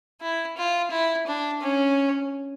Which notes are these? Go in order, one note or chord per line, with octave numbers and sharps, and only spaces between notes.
E4
F4
E4
D4
C#4